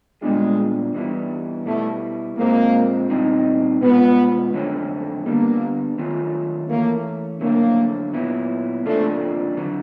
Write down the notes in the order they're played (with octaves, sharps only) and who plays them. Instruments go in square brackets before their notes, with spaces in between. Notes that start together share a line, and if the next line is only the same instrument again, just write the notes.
[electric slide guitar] A#2 G3 B3 D4 F4 [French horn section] G#3
[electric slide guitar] G2 E3 G3 B3 E4
[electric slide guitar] B2 G3 B3 E4 [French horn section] A3
[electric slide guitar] A#2 F3 G#3 C4 [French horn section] A#3
[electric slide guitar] A#2 G3 C4 D#4
[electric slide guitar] B2 G#3 C#4 F4 [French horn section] B3
[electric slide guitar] F2 D3 F#3 A3 C#4
[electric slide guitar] D3 G3 B3 [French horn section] A#3
[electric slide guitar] D#3 F#3 A3 C#4 F4
[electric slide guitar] E3 A3 C#4 [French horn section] A#3
[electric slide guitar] F2 D3 F#3 A3 [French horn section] A#3
[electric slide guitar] A#2 F#3 B3 E4
[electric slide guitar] F2 C#3 F3 A#3 D4 [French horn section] A3
[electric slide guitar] D3 F#3